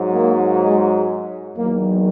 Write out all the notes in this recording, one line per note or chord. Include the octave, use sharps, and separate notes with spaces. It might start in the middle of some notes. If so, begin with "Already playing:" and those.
Already playing: G#2 F#3
A#3
G#3
E2 D#3 F#3 A#3